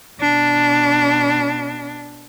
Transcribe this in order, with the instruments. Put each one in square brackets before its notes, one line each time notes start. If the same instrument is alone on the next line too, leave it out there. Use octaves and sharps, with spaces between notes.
[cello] B2 D4